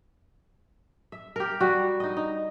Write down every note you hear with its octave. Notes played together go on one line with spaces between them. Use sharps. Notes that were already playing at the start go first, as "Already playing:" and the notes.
E5
G4 A#4
G3 F#4
D#4 D#5
D#4